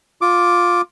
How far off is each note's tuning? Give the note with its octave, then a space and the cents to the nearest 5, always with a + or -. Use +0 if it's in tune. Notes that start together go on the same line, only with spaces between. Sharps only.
F4 +15 D6 -5